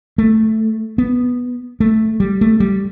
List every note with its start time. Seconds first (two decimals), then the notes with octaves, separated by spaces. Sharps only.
0.18 A3
0.98 B3
1.80 A3
2.20 G3
2.41 A3
2.60 G3